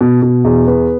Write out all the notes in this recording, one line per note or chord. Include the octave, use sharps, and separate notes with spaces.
B2
B2
E2
B3